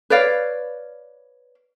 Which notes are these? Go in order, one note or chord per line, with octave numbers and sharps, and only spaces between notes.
B4 C#5 D5 F5